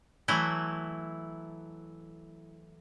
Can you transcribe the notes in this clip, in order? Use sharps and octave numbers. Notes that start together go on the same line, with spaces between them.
E3 F#3 A3 E4